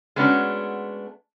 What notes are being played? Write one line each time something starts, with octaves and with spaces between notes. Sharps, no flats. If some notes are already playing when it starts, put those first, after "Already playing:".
G#3 A3 B3 C#4 D4 F#4